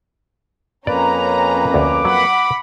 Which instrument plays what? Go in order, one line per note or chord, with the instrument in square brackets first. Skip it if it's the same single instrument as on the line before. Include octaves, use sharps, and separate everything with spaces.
[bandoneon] F2 A#3 B4 [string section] C#4 A#5 [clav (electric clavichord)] D5
[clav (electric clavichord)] D2 [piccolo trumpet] D6
[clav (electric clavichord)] F#3 [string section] F#5 B5